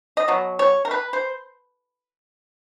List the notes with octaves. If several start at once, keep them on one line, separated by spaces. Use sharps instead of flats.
D#5
B2 F#3
C#5
A#4
B4
C5